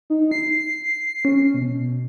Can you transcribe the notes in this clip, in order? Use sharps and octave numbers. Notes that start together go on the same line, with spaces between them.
D#4
C7
C#4
B2